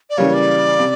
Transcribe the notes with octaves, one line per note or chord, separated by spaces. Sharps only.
D5
C#3 E3 G3 A#3 C#5
D5
C3